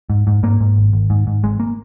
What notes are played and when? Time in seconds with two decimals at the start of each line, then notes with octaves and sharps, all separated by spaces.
0.10 G#2
0.27 G#2
0.43 G#2 A#3
0.60 G#2
0.77 G#1
0.93 G#1
1.10 G#2
1.27 G#2
1.43 G#1 G#3
1.60 A#3